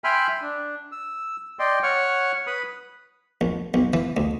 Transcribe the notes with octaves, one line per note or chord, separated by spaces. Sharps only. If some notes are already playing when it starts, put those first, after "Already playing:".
E5 G5 G#5 B5 C6 F6
D4
E6
D5 D#5 G5 C6
C#5 F#5 C#6 F6
B4 B5 D#6
A#1
B1
E3
D2